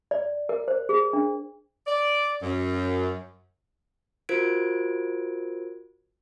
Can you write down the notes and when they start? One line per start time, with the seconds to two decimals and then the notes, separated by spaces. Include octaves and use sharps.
0.11 D5
0.49 A#4
0.68 C5
0.89 G#4
1.13 D4
1.87 D5
2.42 F#2
4.29 F4 F#4 A#4 C5 G#6 D7